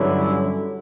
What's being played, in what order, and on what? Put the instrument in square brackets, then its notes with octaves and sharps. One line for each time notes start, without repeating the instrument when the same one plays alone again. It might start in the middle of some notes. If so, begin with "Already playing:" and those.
Already playing: [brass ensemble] G2 D3 F#3 C#4 E4